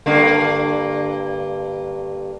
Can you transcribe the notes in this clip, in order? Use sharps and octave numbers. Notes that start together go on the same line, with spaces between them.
G2 D3 A#3